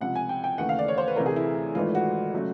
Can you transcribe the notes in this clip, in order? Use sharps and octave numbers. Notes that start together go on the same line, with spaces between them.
C#2 C3 F3 F#5
G#5
G5
G5
D#2 C#3 E3 A3 F#5
F5
D5
C#5
C5
B4
D2 C3 E3 A3 A#4
G#4
E4
G#1 G#2 E3 A3 F4
F#4
C#3 F#3 A3